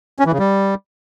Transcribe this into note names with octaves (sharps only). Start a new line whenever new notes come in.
C#4
E3
C#3
G3